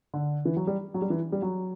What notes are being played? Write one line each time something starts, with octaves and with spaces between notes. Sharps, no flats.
D3
E3
F#3
G3
F#3
G3
E3
G3
F#3